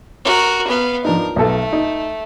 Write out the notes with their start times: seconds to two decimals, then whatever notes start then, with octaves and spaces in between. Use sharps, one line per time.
0.25 F#4 A#4
0.68 B3 F5
1.05 F3 D4 D#4 A#4
1.36 B1 A3 A4
1.73 D#4